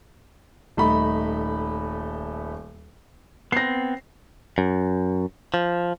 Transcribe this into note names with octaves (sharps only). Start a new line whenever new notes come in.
D#1 A3 D#4 B5
B3 C4 A#6 C7
F#2
F3